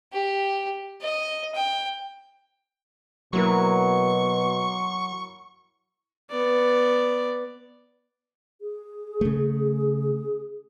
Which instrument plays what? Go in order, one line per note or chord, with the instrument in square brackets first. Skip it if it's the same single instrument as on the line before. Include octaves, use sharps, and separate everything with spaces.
[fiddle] G4
D#5
G5
[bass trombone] B2 [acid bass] F#3 [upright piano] A#3 E4 A#4 [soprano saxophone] C#6
[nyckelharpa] B3 D5
[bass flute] G#4
[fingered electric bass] C#3 A3